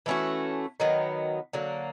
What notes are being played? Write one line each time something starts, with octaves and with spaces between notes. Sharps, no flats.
E3 A3 C#4 F#4
D#3 F#3 B3
D3 F#3 A#3